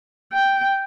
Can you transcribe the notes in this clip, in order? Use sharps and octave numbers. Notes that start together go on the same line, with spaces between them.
G5